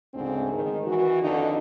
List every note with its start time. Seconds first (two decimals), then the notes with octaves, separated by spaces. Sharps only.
0.14 D2 G#2 C#3 C4
0.52 D#3 G#3
0.87 E3 F#4
1.22 F2 D3 D#3 D#4